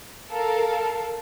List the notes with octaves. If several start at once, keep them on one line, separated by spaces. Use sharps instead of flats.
A4 A#4 F5